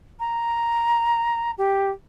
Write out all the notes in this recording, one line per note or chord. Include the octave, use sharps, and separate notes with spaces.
A#5
G4